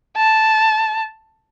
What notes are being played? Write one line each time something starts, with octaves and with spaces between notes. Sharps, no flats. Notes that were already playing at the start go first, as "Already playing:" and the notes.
A5